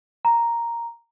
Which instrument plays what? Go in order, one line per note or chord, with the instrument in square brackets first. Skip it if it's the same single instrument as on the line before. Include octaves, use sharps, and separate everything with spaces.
[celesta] A#5